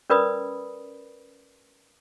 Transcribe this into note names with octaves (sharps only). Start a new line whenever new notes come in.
C#4 A#4 B4 D5 B5 D#6